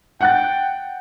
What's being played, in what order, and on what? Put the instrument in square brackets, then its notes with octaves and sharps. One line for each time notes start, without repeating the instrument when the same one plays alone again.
[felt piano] F#5 F#6 A6 [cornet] G5